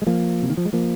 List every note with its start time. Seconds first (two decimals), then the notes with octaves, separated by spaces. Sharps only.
0.02 G#3
0.07 F3 A#3
0.42 C3
0.50 D#3
0.57 F3
0.65 G#3
0.73 F3 A#3